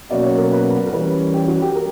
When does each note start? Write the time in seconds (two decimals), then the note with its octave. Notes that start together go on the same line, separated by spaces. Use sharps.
0.10 B2 F#3 A#3 C#4 F#4 D5
0.24 C#5
0.38 A#4
0.52 B4
0.87 A#4
0.93 E3 G3 C#4 B4
1.34 G4
1.48 F#4
1.62 G4
1.75 A#4